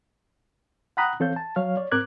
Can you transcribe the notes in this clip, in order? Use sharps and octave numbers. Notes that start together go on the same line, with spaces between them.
F#5 G5 A#5 B5 D#6 F#6
E3 C4 A4 C#5 F5 G6
A5
F#3 C#5 F5 F6
C#5 D5
G#2 C4 A#4 D6 F#6 G#6